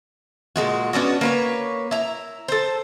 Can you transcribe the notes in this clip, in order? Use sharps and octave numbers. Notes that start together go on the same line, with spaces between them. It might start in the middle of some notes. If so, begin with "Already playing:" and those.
A#2 D3 G#3 F#4
B3 C#4 D4 F#4
A#3 B4 C#5
E4 A#5
A4 C5